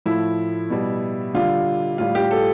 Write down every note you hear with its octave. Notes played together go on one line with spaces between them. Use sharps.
A2 F3 A3 E4
B2 G3
D3 G3 F4
A2 G3 F4
G4
A4